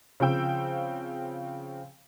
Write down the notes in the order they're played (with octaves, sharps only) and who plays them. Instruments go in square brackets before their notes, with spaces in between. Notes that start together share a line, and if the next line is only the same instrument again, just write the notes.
[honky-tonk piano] C#3 F3 C4 G5 E6